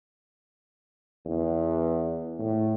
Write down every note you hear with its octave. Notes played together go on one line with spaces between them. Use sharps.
E2
A2